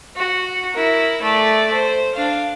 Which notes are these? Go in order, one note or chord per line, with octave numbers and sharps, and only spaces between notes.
F#4
E4 A#4
A3 D5
C5
D4 F5